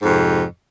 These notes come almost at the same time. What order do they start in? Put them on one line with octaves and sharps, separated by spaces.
G#2 F2 C3